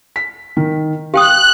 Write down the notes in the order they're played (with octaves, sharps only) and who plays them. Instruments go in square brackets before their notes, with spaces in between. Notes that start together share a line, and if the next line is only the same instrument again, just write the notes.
[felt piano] B6
D#3
[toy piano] G4 G5 D#6 [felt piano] F5 [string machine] F#6